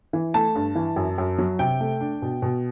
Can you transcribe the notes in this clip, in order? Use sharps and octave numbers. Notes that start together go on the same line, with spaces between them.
E3
A3 A5
G2
E3
F#2
F#2
F#3
C3 G5
A3
D4
B2
B2